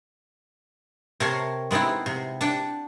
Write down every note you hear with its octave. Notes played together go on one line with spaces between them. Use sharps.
C3 A#4 C#5 A5 A#5 C6
G#3 B3 C4 D#4 E4
C3
D4 F#5 G5 A5